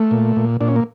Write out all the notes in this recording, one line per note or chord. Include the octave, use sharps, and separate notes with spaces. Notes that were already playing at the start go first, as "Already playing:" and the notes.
Already playing: A3
A#2
A#2
A#2 D4
C#4
A#3